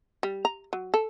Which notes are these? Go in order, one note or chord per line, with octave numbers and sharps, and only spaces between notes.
G3
A#5
F#3
A4